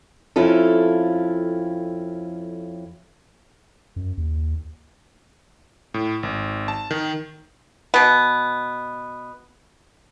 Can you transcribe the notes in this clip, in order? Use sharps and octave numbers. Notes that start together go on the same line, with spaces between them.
F2 C#4 E4 F4 A4
F#2
D#2
A2
G#1
A5
D#3
B2 B3